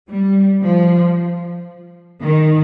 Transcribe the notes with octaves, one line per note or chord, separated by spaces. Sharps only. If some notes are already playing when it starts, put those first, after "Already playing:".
G3
F3
D#3